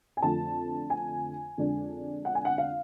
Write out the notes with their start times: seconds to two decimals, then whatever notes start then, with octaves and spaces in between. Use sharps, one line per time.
0.17 G#5
0.22 F2 D3 F3 A3 A5
0.90 G#5
1.57 F2 D3 G#3 D4
2.25 F#5
2.35 G#5
2.45 F#5
2.58 F5